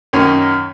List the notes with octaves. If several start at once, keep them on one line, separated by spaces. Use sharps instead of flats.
F#2 D#3 A#3 C#4